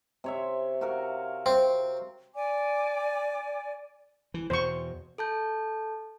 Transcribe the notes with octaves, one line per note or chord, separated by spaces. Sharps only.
C3 C#5 E5
F#4 A#4 F5
C4
D5 G#5 D6
E3
E2 B2 E3 C5 C#6
A4 A5 G6